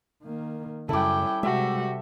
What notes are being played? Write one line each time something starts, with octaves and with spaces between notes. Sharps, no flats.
D#3 A#3
F#2 C#3 G3 C#4 E4 A4 G5 D6
C3 G3 G#3 F#4 G4 E5